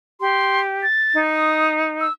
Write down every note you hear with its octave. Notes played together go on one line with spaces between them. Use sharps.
G4 C6
A6
D#4
D#6
E6